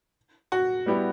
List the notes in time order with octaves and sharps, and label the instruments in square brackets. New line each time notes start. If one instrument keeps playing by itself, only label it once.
[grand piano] F#4
[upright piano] G3 B3 E4 G4 D5